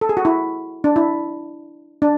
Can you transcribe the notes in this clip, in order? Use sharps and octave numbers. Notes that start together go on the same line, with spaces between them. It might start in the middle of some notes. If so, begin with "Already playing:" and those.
A4
G#4
F#4
E4
D4
E4
D4